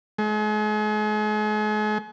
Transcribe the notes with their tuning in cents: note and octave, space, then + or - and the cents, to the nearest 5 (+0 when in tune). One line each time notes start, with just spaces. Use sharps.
G#3 +40